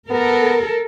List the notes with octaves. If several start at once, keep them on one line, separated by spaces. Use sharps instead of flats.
B3 A4 A#4